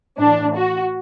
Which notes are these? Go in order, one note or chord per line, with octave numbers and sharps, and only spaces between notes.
A2 E3 D4
F#4